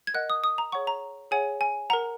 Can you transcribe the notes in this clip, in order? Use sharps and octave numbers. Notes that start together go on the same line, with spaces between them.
G#6
A#4 D#5 F#5 F#6
D#6
D#6
A#5
G#4 C#5 F#5 C#6
A#5
G#4 C#5 F#5 G#5
G#5
A#4 F#5 A#5